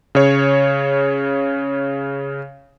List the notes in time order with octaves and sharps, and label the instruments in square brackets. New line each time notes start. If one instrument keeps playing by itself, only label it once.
[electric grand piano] C#3 C#5